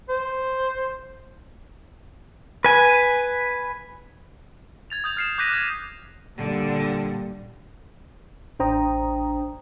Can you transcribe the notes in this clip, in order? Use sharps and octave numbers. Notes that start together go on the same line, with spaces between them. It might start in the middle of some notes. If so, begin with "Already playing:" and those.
C5
B4 G#5
G#6 A6 F7
D#6 G6 F7
F6 C7 E7
D6 F#6 G6 A#6 B6 D#7
G#6
A#2 D3 G3
A1 D4 C5 G5 A#5 D#6